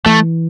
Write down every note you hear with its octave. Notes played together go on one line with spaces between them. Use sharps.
E3 A3